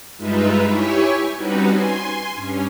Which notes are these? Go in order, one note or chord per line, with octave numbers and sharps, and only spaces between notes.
G2 G#3 D#4 F4 B4 E5
E4 G4 C#5 E5 G#5 C#6
G3 C4 C#4 D#4 F#4 B4
G#5 C6
G2 C#4